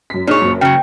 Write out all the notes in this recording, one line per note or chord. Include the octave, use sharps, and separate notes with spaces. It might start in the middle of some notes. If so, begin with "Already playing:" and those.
F#2 B6
A#2 D4 D#4 G#4 C#5
F#1 F#2
C#3 F#3 G5